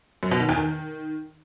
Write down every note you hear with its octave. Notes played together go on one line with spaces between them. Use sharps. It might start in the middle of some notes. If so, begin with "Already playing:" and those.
F#2
B2
D#3
E2
D#3